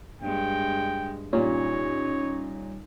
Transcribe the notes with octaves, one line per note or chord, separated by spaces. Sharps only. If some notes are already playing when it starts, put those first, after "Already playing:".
G2 G#3 G5
A#2 G3 C#4 D#4 C#5